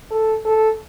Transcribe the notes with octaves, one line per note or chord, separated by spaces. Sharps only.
A4
A4